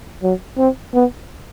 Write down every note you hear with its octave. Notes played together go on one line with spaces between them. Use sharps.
F#3
C4
B3